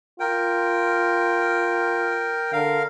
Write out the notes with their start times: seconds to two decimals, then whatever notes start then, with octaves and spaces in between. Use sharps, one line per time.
0.20 F4 A#4 G5
2.53 D3 A#4 F5